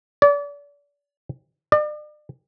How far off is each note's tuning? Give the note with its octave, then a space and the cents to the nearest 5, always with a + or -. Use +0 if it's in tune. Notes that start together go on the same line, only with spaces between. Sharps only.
D5 -35
D5 +40